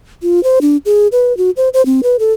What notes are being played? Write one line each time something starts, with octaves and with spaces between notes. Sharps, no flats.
F4
C5
D4
G#4
B4
F#4
C5
C5
C4
B4
A4